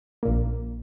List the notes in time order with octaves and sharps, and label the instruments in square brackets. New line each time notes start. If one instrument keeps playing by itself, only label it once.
[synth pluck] A#1 A#2 A#3